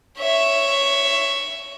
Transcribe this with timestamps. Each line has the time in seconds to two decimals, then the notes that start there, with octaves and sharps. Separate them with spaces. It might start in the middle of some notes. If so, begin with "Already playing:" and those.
0.18 C#5 E5